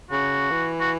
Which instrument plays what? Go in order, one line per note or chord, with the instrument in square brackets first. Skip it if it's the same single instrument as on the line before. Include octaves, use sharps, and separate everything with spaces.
[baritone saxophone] C#3 [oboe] F#4
[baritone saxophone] E3
[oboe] F#4